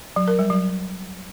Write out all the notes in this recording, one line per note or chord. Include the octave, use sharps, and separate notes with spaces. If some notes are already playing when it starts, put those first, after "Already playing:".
F#3
A#4
G3
F#3